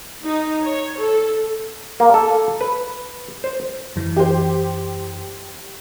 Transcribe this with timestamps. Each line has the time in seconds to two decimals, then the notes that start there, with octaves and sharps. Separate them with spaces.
0.25 D#4
0.63 C#5
0.98 A4
2.00 A#3
2.14 A4
2.61 B4
3.44 C5
3.96 F#2 E3
4.16 G4 C5